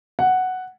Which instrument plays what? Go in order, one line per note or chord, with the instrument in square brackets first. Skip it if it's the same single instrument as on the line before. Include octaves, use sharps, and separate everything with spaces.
[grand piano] F#5